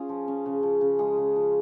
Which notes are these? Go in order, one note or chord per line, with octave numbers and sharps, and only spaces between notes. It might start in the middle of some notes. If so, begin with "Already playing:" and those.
Already playing: C#4 F4 G#4
F3
C#4
C#3
F3
C#3
G#3 G#4
C#3
F3